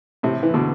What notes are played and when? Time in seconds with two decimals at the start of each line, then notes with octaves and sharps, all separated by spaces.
0.23 A2 C3
0.43 E3
0.54 B2 D3